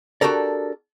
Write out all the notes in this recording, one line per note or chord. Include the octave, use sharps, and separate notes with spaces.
D4 F#4 G4 A4 A#4 D5